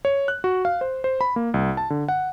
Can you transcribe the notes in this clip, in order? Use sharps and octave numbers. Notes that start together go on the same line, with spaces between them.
C#5
F#6
F#4
F5
C5
C5
B5
A#3
C2
A5
D3
F#5